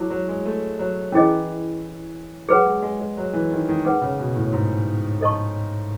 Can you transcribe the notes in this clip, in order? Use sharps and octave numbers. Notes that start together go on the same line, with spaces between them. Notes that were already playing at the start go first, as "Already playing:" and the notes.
Already playing: F#3 E4 G#4 A5
F#3
G#3
A3
F#3
E3 C#4 E4 G#4 D#5
F#3 G#4 B4 F#5
G#3
G#3
G#3
F#3
E3
D#3
D#3
D#3 G#4 B4 F#5
C#3
B2
A2
G#2
A4 D#5 A5 C#6